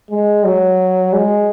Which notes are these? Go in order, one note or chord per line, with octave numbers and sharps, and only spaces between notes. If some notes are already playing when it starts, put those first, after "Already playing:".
G#3
F#3
G#3